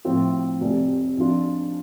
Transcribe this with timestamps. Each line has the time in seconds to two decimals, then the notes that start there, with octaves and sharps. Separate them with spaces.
0.05 A2 F3 C4 F4
0.61 F1 F2 C3
1.17 F2 F3 D4 F4